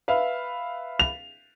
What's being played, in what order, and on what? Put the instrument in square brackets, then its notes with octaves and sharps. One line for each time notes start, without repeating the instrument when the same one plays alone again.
[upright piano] B4 E5 F5
[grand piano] F7